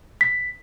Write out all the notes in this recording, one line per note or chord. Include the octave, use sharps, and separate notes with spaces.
B6